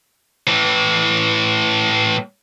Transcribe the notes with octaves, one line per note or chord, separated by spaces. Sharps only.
A2 E3